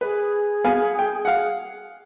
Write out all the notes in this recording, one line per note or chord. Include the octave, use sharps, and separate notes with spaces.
G#4 B4
B3 F5 G#5
G5
F5 F#5